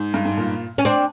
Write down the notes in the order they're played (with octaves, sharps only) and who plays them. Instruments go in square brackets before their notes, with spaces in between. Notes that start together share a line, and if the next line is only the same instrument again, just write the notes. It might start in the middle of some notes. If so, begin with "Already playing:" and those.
Already playing: [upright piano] G#2
G2
G#2
A#2
[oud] C#4
C4 D4